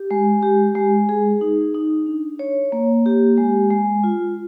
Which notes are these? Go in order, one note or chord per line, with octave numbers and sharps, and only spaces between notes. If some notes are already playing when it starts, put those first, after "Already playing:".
Already playing: G4
G#3
G4
G#3
G#4
D#4
D#4
D4
C#5
A#3
G4
G#3
G#3
F4